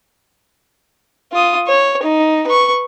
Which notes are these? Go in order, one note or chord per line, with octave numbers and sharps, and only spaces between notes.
F4 D#6
C#5
D#4
B4 C#6